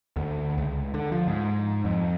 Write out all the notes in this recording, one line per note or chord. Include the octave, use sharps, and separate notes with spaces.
D2
C#2
D3
F3
G#2
F2